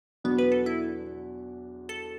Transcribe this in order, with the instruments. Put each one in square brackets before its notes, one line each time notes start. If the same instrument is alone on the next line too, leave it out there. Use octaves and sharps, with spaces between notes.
[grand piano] E2 B2 F#3 D4 F#4 [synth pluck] B3
[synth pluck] B4
A4
E4
A4